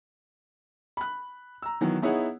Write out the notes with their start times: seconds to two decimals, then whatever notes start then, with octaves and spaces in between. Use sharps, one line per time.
0.97 B5 F#6
1.62 A#5 E6
1.81 D#3 E3 F#3 B3
2.02 B3 D#4 E4 G#4 C#5 F#5